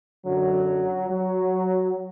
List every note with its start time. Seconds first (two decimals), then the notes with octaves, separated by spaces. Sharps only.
0.25 F#2 D3 F#3
1.08 F#3